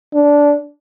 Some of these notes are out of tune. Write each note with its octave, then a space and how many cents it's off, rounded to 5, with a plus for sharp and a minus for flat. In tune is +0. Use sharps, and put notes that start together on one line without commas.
D4 -15